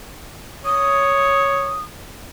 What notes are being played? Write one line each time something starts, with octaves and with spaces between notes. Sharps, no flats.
C#5 D#6